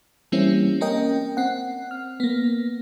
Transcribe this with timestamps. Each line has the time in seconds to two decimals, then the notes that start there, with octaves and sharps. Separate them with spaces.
0.32 E3 G3 A#3 C4 C#4 E4
0.81 A#3 C#4 A#4 D#5 G5
1.37 C4 F#5
1.91 F6
2.20 A#3 B3